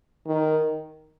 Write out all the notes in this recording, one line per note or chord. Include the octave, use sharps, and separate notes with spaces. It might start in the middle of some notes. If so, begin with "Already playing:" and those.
D#3